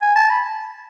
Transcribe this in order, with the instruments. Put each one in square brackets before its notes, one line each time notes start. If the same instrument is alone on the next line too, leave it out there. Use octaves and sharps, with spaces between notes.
[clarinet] G#5
A5
B5